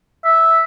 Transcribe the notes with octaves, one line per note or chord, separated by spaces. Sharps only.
E5